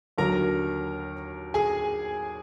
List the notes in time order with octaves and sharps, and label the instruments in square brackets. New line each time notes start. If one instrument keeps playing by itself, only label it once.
[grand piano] D#2 D3 F#3 A#4 A#5
G#4 G#5